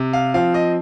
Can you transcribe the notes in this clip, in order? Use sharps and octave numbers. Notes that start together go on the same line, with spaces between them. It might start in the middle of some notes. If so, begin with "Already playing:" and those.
Already playing: C3
F5
F3 C4 F5
D#5